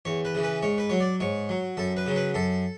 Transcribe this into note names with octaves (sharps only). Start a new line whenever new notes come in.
E2 C#5
B4
C#3 E3
B4
G#2 C#5
B4
F#3 C#5
D5
G#2 C#5
F#3
F#2 A4
B4
C#3 F#3
B4
F#2 A4